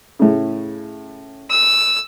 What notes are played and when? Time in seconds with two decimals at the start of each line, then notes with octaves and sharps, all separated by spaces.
0.19 A2 C#3
1.51 E6